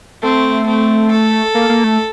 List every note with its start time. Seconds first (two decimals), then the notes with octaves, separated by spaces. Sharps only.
0.22 A3 C4
0.67 C4
1.11 A4
1.55 A#3
1.69 A#3
1.84 A3